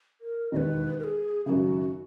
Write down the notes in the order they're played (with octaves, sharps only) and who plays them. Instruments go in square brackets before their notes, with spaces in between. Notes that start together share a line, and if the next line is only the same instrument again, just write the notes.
[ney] A#4
[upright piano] E1 D#2 D#3 [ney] B4 D#5
[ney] A#4
G#4
[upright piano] C#3 [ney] G#4
[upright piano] G#1 F#2 [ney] F#4